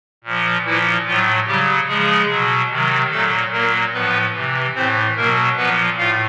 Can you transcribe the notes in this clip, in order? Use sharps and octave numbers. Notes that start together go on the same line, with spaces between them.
A#2 F3
A#2 E3 F3 E4
A2 F3 F#3 F4
C#3 F#3 G3 G4
C#3 F3 G#3 G#4
B2 F#3
C3 D#3 F#3
A#2 F#3 A3 A4
A#2 F#3 A#3 A#4
A2 F3 B3 B4
C3 E3
A2 E3 C4 C5
B2 F#3 A#3 A#4
A#2 F3 B3 B4
A2 F4 F5